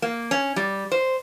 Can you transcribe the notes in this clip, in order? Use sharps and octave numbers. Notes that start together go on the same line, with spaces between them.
A#3
C#4
G3
C5